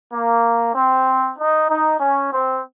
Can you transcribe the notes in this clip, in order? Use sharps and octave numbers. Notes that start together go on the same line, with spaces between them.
A#3
C4
D#4
D#4
C#4
C4